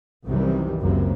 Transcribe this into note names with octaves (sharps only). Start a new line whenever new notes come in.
C2 F#2 C3 D#3 E3 G3
F#1 C#2 F#2 C3 A#3